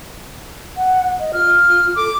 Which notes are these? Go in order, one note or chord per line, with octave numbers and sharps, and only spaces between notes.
F#5
D#5
F4 F6
A4 D6